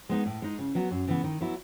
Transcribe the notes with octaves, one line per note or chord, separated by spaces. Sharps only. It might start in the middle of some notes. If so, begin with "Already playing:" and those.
G#3 B3 D#4
A2
G#3 D#4
C#3
F#3 B3 F#4
F#2
C#3 E3 B3
D#3
F#3 B3 E4